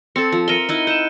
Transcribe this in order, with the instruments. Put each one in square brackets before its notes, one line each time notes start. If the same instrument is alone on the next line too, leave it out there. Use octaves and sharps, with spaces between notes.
[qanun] C4 A4 [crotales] C#7
[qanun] F3
[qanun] A#4 E5 [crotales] C#7 D#7 G7
[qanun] D#4 E4 F#5
[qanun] F#5 [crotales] G6 D#7 E7